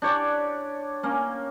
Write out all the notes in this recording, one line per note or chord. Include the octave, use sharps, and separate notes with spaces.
D4 G4 C#5 D5
A#3 C#4